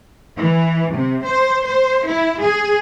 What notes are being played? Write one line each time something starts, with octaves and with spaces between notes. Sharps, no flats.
E3
C3
C5
C5
E4
G#4